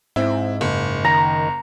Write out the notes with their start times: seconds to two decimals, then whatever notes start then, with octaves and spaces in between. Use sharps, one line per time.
0.16 G#2 C4 E4
0.61 F#1
1.05 D#3 A#5